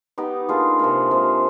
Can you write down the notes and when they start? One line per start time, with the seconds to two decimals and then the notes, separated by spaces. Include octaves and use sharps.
0.18 B3 D#4 G4 B4
0.49 A#3 D4 F4 G#4
0.79 C3 F3 A#3
1.11 C3 F3 G#3